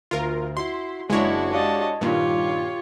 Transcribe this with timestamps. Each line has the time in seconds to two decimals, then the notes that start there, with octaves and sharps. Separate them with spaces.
0.11 D2 F4 A#4
0.57 E4 F#4 C6
1.10 F#1 G#3 D4 E4 F#4 C#5 D#5
1.53 G4 D5 D#5 F5 A5
2.01 G2 A#2 D#3 F4 G4 C#5